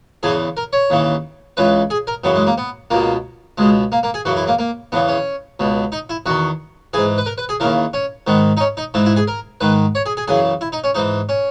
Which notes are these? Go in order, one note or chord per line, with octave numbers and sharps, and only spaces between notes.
E2 C#3 E3 G#4
A#4
C#5
D#2 C#3 E3
C#2 C#3 E3 B4
G#4
A#4
F#2 C#3 E3 B3
G#3
A#3
B3
C#2 B2 A#3
C#2 B2 G#3
A#3
A#3
G#4
F#2 C#3 E3 F#4
E4
A#3
A#3
E2 C#3 E3 B3
C#4
C#2 B2
D#4
E4
E2 D#3 F#4
G#2 E3 G#4
B4
A#4
B4
G#4
D#2 C#3 E3 A#4
C#4
G#2 D#3 B3
D#4
C#4
D#4
G#2 E3 E4
E4
G#4
A#4
G#2 D#3 B4
C#5
G#4
G#4
F#2 C#3 E3 G#4
E4
D#4
C#4
G#2 E3 D#4
C#4